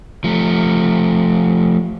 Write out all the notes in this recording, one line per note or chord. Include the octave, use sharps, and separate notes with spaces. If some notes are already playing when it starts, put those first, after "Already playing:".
F3 A3